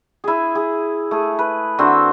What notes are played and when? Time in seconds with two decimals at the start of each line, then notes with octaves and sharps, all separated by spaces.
0.24 E4 G#4
0.55 G#4
1.11 A3 G#4
1.39 B4
1.78 D3 C4 F#4 E5